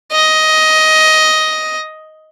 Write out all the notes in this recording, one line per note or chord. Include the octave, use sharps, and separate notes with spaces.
D#5